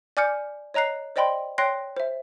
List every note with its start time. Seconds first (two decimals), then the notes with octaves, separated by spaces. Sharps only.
0.17 D5 G#5 D6 F6 G6 C#7
0.74 C#5 D#5 A#5 F#6 C7
1.16 C5 D5 D#5 G5 B5 C6
1.58 C#5 G5 C6 F#6 A#6 C7
1.97 C5 E5